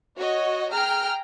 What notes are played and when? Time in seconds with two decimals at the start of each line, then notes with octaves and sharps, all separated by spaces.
0.17 F#4 C#5 D#5
0.72 G#4 G5 A#5 F6